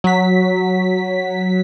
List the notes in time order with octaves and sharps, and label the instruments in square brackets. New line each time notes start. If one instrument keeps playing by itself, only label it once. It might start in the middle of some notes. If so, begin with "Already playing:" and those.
[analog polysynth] F#3 B6